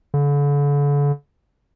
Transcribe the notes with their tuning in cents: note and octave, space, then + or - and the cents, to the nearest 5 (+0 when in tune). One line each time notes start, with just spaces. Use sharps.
D3 -40